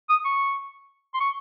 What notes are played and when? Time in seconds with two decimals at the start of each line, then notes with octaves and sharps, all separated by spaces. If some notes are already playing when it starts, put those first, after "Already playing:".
0.10 D#6
0.25 C#6
1.14 C6
1.20 C#6